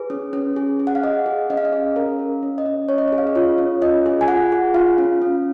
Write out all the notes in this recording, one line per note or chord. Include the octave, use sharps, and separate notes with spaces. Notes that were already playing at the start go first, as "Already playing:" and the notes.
Already playing: G#4 B4
C#4
C#4
G#4
G#4
F#5
F5
G#4 D#5
G#4
C#4 D#5
F5
D#5
G#4
C#4 A#4
C#4
C#4
D#5
C#4
C#4 C#5
D#5
G#4 C#5
F5
D#5
F4 C#5
C#4
F4 D#5
G#4
G#5
F4 F#5
G#4
F4 F5
C#4
C#4